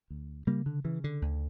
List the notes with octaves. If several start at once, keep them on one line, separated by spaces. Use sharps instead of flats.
D2
C#3 G3 A#3
D3
C#3 E3
D3
D2